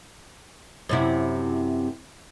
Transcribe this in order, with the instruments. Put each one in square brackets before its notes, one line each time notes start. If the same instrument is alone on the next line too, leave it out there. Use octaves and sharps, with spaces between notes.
[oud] F#2 C3 E4